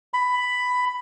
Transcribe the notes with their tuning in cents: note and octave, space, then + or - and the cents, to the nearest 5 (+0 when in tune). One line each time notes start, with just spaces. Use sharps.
B5 +10